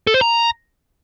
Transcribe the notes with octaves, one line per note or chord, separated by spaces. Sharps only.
A4
C5
A#5